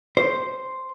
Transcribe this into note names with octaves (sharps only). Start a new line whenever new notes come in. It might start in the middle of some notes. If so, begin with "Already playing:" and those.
C5